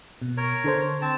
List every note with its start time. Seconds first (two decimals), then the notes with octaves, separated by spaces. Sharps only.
0.22 B2
0.37 A#4 C#5
0.64 D3 A4 C5
1.01 C4 A5